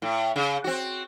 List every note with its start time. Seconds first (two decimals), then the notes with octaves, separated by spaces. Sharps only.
0.02 A2
0.36 C#3
0.64 C4 F#4